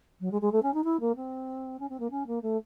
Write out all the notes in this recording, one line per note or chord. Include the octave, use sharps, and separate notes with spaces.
F#3
G#3
G#3
A3
C#4
D#4
E4
A#3
C4
C#4
C4
A#3
C#4
A#3
A3